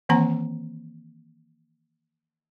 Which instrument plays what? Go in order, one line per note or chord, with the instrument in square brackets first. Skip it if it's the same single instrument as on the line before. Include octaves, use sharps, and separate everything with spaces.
[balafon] D#3 E3 A#3 C4 F#5 A#5